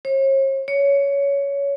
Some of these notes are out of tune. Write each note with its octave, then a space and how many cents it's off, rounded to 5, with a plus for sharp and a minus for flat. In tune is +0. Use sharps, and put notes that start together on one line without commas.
C#5 -45
C#5 +15